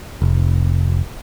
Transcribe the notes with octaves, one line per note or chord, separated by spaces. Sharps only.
F1